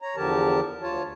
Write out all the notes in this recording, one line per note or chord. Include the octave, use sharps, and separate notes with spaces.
C#5 A#5
E2 D3 F3 G4 A#4 A5
D2 F4 C#5 A5